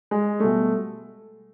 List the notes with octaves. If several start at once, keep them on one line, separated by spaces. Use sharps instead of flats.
G#3
B2 G3 A3